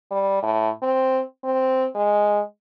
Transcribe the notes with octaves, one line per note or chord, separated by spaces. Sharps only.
G3
A2
C4
C4
G#3